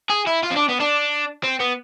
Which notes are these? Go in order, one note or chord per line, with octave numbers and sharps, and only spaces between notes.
G#4
E4
F4
C4
D4
B3
D4
C4
B3